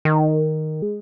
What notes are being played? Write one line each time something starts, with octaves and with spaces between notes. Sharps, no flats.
D#3
G#3